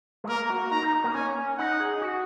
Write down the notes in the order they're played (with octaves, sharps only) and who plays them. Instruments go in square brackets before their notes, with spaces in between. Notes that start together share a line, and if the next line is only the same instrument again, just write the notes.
[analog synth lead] G#3
[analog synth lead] A#3 [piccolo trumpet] A#4
[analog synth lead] F#4
[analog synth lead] D#4 [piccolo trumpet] A#5
[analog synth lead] D#4
A#3
[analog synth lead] C#4 [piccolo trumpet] G#5
[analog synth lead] D#4 [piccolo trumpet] F#5
[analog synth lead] G#4
F#4